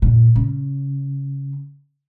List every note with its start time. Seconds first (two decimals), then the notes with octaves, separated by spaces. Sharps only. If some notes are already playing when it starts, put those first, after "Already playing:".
0.02 A#2
0.36 C#3